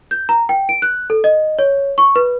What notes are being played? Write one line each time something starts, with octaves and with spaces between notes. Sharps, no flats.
G6
A#5
G5
D7
F#6
A4
D#5
C#5
C#6
B4